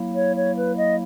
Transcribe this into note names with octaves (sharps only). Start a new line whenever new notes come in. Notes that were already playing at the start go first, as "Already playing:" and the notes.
Already playing: F#3 A#3 E4
C#5
C#5
B4
D#5